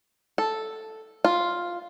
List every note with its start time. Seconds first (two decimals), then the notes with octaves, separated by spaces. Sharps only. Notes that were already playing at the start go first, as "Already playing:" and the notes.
0.38 A4
1.25 F4